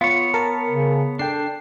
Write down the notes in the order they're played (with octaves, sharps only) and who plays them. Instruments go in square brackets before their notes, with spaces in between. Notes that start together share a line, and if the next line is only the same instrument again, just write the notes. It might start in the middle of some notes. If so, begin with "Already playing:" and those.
[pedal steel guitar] B3 C#5 [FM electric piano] F4
[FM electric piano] A#4 A5
[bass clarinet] C#3
[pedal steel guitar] D4 [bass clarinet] A4 [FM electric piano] G5 C7